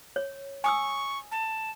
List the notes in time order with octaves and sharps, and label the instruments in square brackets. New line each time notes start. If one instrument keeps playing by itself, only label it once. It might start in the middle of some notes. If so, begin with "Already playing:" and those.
[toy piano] C#5
[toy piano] G#5 D#6 E6 [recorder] C#6
[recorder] A5